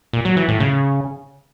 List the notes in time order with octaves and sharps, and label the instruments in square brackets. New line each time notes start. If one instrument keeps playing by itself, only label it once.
[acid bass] A#2
F#3
E3
A2
C#3